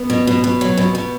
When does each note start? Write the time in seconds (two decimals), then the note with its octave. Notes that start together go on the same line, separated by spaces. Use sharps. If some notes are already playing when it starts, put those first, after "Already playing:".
Already playing: B3
0.10 B2
0.27 B2
0.44 B2
0.61 F#3
0.77 B2
0.95 B2